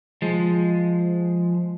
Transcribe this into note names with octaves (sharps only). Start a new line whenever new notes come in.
F3 G#3